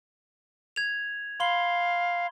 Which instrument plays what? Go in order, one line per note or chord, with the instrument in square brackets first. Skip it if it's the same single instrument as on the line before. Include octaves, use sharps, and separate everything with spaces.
[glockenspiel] G#6 F7
[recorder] F5 [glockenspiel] B5 C6 G7